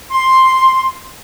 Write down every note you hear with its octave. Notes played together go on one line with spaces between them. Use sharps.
C6